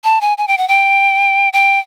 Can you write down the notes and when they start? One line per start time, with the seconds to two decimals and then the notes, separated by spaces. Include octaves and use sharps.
0.04 A5
0.21 G#5
0.38 G#5
0.47 G5
0.57 F#5
0.68 G5
1.53 G5